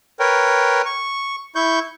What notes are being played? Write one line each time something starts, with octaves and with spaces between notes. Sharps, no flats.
A#4 B4 C#5 G5
C#6
E4 C#6 G6